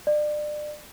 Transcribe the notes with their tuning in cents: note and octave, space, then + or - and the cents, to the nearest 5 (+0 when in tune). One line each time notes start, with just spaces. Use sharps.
D5 +30